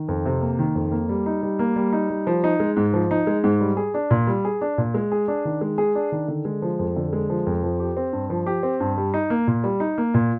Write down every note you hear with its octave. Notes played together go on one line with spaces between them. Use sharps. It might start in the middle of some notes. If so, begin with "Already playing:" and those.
Already playing: D#3
F2
C3
A#3
D#3
F2
A#3
G3
D#4
G3
A#3
G3
D#4
G3
F3
D#4
G#3
G#2
F3
D#4
G#3
G#2
G3
G#4
D4
A#2
G3
G#4
D4
A#2
G#3
G#4
D4
D#3
G#3
G#4
D4
D#3
D3
G#3
F3
F2
D3
G#3
F3
F2
F3
G4
C4
G2
F3
G4
C4
G2
G3
D#4
A#3
A#2
G3
D#4
A#3
A#2